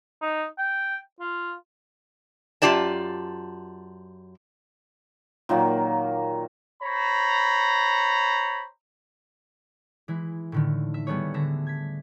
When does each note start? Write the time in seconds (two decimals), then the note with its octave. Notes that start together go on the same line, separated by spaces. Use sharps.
0.22 D#4
0.59 G5
1.20 F4
2.62 F#2 A#3 F4 G4 D5 A5
5.49 A#2 D#3 F#3 A#3
6.83 C5 C#5 A#5 B5
10.08 E3 G#3 E4
10.52 A2 D3 D#3
10.94 E5
11.07 G3 A3 B3 G#4 C#5
11.34 D3 D4 E5 A#6
11.67 G#6 B6